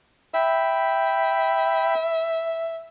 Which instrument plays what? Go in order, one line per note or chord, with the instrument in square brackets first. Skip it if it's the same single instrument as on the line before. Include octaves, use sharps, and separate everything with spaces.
[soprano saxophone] E5 [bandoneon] G5 B5